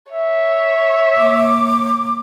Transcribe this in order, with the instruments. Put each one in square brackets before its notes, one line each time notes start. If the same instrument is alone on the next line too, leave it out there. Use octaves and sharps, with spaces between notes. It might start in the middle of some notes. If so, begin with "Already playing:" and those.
[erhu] C#5 [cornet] E5
[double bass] A#3 [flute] D6